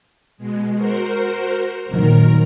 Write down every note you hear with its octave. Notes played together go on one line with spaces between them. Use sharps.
B2 G#3
F#4 A#4 C5
A#2 D#3 F#3 A#4